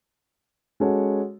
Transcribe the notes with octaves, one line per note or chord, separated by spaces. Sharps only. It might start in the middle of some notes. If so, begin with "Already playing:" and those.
G#3 C#4 F#4 A4 C#5